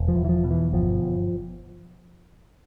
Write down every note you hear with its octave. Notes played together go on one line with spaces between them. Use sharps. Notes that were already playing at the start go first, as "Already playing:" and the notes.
Already playing: E1
F3
E2
E3
F3
B2
E3
G1 F3
G1